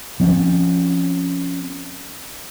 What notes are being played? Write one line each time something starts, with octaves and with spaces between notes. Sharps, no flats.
F3 C4 C#4